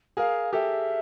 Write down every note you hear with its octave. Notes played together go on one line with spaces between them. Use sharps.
G#4 A#4 F5
G4 A4 E5